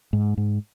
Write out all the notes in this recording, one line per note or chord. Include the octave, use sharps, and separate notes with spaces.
G#2
G#2